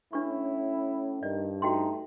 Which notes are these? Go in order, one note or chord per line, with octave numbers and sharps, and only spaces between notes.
A2 C#4 D4 E4 B4 C#6
G2 D#3 D5
A3 D#4 F#4 G5 C6